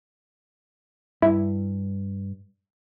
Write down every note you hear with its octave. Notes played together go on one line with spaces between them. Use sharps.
G2 E4